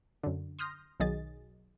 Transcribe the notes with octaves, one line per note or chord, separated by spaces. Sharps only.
F#2 D3
C6 D#6 F6 G6 A#6
B1 D#3 F#3 G#4 D#5 A6